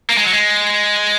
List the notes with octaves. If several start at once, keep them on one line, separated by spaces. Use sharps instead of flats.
A#3
G#3
F#3
G#3